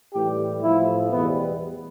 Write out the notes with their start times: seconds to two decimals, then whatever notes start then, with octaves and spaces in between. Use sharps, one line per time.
0.13 A2 E3 G3 G4
0.62 A2 F3 E4
1.11 E2 B2 G3 B3